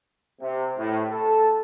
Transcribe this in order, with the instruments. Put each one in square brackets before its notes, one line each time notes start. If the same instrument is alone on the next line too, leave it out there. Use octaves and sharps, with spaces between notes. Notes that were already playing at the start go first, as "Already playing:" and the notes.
[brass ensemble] C3
A2
A4